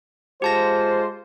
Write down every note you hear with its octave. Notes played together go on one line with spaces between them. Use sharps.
G#3 F4 G4 C5 A5 A#6